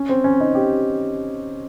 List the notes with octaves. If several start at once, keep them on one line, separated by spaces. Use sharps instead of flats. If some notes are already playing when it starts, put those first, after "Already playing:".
Already playing: C#4
C4
C#4
D#4
G4